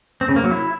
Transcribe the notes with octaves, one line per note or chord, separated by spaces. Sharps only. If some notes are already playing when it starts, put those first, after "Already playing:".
C4
C#3
A#3
F#3
E4